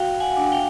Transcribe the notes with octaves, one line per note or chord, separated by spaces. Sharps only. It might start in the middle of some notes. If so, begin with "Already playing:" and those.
Already playing: F#4 F5 G5
F#5 G#5
D4
F5 G5